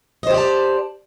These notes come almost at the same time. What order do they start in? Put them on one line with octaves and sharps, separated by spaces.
D#5 C5 G4 D5 A5